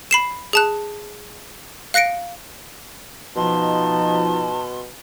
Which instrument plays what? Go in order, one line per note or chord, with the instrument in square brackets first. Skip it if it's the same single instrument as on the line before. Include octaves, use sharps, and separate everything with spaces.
[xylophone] B5 C7 E7
G#4 A5 F#6
F5 F#6 A#6 C#7 D7
[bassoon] B2 [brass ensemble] F3 D#4 F4 [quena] A5 [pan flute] C6